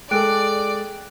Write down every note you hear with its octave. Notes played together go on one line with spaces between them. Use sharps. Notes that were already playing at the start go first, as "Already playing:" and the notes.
G#3 G#4 A4 D5 G5 F#6 D7